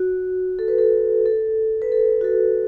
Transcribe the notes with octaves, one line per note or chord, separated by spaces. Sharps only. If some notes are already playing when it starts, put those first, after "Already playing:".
Already playing: F#4
A4
B4
A4
A4
B4
A4
F#4
A4